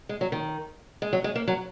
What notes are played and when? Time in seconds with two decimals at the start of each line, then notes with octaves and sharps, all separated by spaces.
0.09 G#3
0.21 F#3
0.32 D#3
1.02 G#3
1.13 F#3
1.24 G#3
1.35 A#3
1.48 F#3